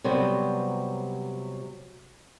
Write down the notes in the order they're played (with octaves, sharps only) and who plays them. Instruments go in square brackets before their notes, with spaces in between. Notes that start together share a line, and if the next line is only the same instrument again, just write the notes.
[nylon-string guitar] C3 F#3 G3 B3 C5